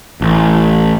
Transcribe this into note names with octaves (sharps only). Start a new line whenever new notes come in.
A1